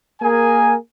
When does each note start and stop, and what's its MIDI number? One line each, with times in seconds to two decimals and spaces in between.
0.21 0.74 58
0.21 0.74 68
0.21 0.74 70
0.21 0.74 80